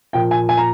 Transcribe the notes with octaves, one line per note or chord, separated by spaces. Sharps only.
A#2 F3 A#3 G5
G#5
G#5
A#5